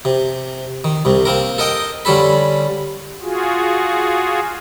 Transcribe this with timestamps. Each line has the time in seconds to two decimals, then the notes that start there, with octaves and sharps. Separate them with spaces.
0.05 C3
0.84 D#3
1.05 C2 C3
1.25 A#3 C4 A#4
1.58 A4 A#4 D#5 G5
2.05 D3 G3 C#4 A4 B5
3.22 F4 F#4 G#4